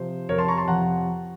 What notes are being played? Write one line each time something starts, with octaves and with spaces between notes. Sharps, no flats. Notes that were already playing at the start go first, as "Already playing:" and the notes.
Already playing: C3 F3 C5
F2 C3 F3 A#4 C#5
A5 C6
A#5 C#6
A5 C6
F2 C3 F3 F#5 A#5